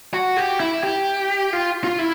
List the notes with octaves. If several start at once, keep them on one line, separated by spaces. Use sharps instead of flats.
F#4
G4
E4
G4
F4
F4
E4